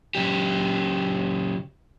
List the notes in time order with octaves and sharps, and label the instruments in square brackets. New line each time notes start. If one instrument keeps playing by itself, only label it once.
[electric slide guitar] C#3 F#3 G4